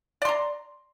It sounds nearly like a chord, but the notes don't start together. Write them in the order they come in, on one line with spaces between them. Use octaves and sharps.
D5 C6 A#5